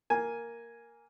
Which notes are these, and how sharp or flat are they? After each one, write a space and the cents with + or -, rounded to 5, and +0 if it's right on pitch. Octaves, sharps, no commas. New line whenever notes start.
A#3 +0 G#5 +0